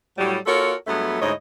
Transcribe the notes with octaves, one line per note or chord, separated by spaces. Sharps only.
A2 F#3 G3
A#3 F4 F#4 A4 A#4 C#5
G2 F#3 G#3 A3 B3
D2 G#2 E4 C#5 D#5